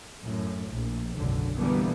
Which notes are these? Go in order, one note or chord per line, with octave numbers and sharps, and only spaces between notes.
F#2 A2
A#1
F#1 B1 G#2 D3
B2 D3 E3 G3 A#3 B3